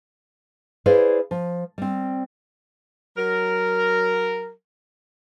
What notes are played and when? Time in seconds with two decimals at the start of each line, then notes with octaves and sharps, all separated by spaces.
0.86 E4 G#4 B4 C5 D5 F5
1.31 F3
1.78 G3 C4
3.17 F#3 A#4